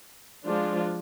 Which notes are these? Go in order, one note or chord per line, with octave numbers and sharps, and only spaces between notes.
F3 G#3 D4 F4